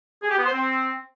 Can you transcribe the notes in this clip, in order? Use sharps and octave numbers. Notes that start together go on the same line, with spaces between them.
G#4
G4
B3
C5
C4